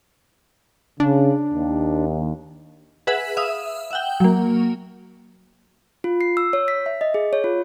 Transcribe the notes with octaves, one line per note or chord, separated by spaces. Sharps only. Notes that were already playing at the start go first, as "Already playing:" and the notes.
C#3 D4
D#2
G#4 B4 E5 F#5 B5
E5 F5 D#6
E5 F#5 G5
F#3 A#3
F4
C7
E6
C#5
B6
E5
D#5
G#4
C#5
F4